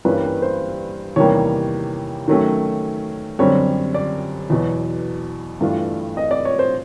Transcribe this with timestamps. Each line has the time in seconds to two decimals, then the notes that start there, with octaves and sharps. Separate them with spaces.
0.05 G2 E3 G3 A#3 C#4 B4
0.24 B4
0.42 C5
1.16 E2 C3 D#3 G3 A#3 C#5
2.28 D#3 F#3 A3 C#4
3.39 F#2 D3 G3 C4 C#5
3.94 D5
4.50 E2 B2 F#3
5.61 G2 E3 A3 D4 F4
6.17 D#5
6.31 D5
6.45 C#5
6.59 C5